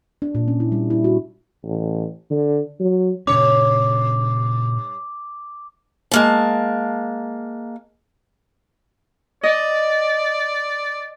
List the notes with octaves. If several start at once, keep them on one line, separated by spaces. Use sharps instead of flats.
D4
A#2
C#4
E4
G3
E4
F#4
A1
D3
F#3
G2 A#2 C#3 C#4 C#5 D6
G#3 A#3 A5
D5 D#5